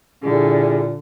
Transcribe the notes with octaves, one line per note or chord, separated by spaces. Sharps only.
A#2 D3 G3 E4 G#4